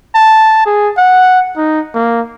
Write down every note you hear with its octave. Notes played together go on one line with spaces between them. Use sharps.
A5
G#4
F#5
D#4
A#3